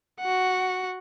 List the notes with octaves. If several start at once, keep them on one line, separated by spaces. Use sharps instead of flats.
F#4 F#5